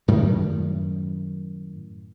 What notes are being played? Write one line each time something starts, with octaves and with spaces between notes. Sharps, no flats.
F#2 A2 D#3 G3